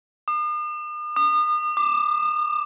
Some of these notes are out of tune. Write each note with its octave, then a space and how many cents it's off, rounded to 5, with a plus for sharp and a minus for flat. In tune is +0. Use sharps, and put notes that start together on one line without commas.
D#6 -45
D#6 -35
D6 +15